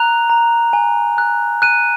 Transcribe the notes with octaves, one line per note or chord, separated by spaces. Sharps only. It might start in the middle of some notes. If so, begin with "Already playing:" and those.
Already playing: A#5 F#6 F7
A#5
G#5
F#6
F#6 D#7